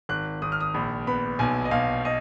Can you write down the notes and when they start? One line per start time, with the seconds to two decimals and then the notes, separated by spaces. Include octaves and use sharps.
0.09 G#1 F#6
0.42 G#1 D#6
0.52 F6
0.60 D#6
0.74 A#1 B5
1.07 B3 B5
1.39 B1 G#5
1.65 D#5
1.71 B1 F5
2.05 D#5